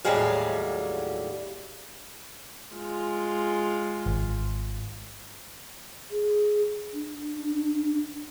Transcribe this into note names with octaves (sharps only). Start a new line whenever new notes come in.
D#2 A2 F#3 G3 G#4 F5
G#3 F4
G#1
G#4
D4